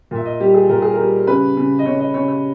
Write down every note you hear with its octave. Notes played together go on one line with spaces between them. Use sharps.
A#2 E5
D#5
G3 G4
G#4
A#2 A#4
G#4
A#4
G3
C#3 B4
C#3
D#5
C#3 C#5
D#5
C#3 C#5
C#5